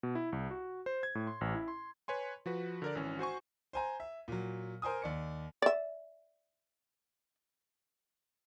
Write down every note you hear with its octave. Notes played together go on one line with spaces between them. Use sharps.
B2
E4
C2
F#4
C5
G#6
A2
C6
A1
E4
C6
B4 C#5 G#5 C6
F3 F#4 B4
D3 A#4 D5
G#1 E3 C#4
F#4 C5 G#5 C#6
C5 G#5 A#5
E5
A#2 F#3
A#4 C5 G#5 D#6
D#2 D5 C#7
D5 E5